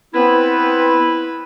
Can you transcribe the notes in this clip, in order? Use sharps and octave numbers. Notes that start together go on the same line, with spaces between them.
B3 C4 E4 B4